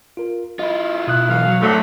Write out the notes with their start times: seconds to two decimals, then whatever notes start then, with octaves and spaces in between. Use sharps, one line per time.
0.17 F4 A#4
0.59 E4 F4 D#5
1.07 B2 D#6 F#6
1.29 B1 E3 F5
1.47 F#3
1.60 F#2 A2 D3 F#3 A3